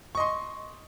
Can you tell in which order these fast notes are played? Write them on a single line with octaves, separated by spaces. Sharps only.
C#6 D#5 C6